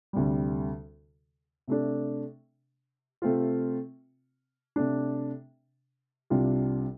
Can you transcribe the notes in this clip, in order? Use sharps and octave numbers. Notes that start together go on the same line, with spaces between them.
D2 C3 G3
C3 A3 D4
C3 A3 C4 F4
C3 A3 D4
C2 C3 G3 D4 F4